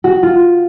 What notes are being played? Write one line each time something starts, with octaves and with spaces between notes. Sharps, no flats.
F#4
F4